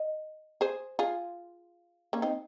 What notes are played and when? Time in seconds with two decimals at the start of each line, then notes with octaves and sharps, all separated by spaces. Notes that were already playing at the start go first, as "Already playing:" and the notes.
Already playing: D#5
0.61 G#4 C5
0.99 F4 G#4
2.13 A#3 C#4
2.22 C4 D#4